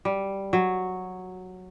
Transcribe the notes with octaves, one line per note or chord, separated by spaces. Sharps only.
G3
F#3